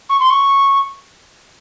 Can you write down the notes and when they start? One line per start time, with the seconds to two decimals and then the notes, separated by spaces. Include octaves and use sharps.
0.09 C#6
0.20 C6
0.30 C#6